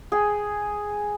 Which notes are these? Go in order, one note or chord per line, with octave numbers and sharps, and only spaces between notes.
G#4 G5